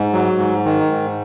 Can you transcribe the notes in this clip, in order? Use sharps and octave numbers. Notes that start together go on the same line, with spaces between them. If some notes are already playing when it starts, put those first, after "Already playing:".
Already playing: G#2
F#3
G#2
D#3
G#2